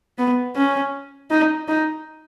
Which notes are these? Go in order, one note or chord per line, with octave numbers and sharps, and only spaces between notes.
B3
C#4
D#4
D#4